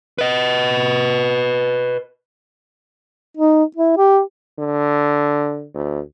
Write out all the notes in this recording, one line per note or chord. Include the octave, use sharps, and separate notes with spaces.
B4 D#5
D#4
E4
G4
D3
D2